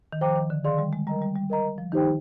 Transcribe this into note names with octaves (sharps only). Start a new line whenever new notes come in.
D#3
F3 C5 G5 A#5 D6
D#3
D3
D#3 G#4 D5 F5 C6
G3
G#3
G3 A#4 D#5 A#5
G3
G3
A#4 D#5 A#5
F3
D#3 D#4 G4 C5 G5